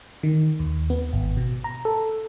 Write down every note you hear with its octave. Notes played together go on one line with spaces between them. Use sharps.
D#3
D#2
B3
G#1
B2
A#5
A4